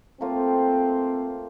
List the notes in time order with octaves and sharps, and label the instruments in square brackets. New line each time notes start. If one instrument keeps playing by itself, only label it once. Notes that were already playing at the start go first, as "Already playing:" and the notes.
[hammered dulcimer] A3 A#3 F4 [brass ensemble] C4